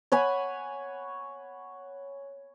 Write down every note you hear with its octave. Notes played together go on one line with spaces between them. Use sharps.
C#5 F#5 G#5 B5